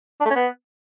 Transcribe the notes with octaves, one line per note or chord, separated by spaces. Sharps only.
D4
A3
C#4
B3